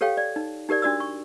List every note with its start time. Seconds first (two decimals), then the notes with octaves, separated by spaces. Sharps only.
0.01 G4 A4 C#5 F5 G5
0.17 D5
0.36 D#4
0.69 D#4 G4 A#4 D5
0.82 D4 F#4 D5 D#6 E6
1.00 C#6